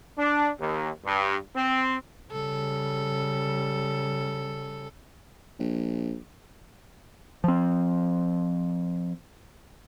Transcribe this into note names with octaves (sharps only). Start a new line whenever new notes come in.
D4
D#2
G2
C4
C#3 G3 A4
A#1
F3 C4